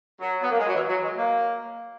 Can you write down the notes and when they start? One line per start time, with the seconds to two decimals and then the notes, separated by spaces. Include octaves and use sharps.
0.20 F#3
0.42 B3
0.50 A#3
0.59 G#3
0.67 F#3
0.75 E3
0.89 F#3
1.03 G#3
1.17 A#3